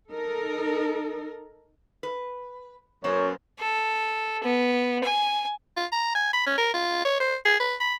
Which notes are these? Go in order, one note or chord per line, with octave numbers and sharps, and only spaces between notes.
D#4 A4 A#4
B4
F#2 A#3 B3 C5 C#5
A4
B3
G#5
F4
A#5
G#5
B5
C#4
A#4
F4
C#5
C5
G#4
B4
B5